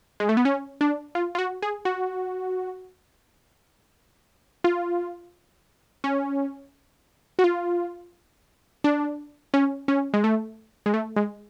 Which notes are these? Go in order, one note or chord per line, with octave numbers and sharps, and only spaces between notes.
G#3
A3
B3
C#4
D4
F4
F4
F#4
G#4
F#4
F4
C#4
F#4
F4
D4
C#4
C#4
G#3
A3
G#3
A3
G#3